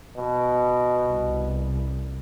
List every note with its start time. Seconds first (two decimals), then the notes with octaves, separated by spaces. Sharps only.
0.16 B2
1.06 C2